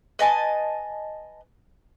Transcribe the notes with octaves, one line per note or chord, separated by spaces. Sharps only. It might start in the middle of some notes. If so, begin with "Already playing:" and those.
B4 D#5 G#5 A5